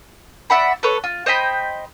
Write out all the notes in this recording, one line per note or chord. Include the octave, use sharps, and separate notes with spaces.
D5 E5 F#5 B5
A4 B4 C#5
F4
C5 D#5 G5 B5